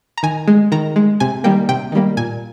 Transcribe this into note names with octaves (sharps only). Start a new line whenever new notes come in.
A#5
D#3 G#5
G#3
D#3 A#5
G#3
C3 G#5
D#3 G3 A#3 G5
C3 G5
D#3 G3 A#3
A#2 G#5